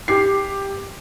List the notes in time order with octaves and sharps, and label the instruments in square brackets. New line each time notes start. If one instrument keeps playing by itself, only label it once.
[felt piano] G4 C7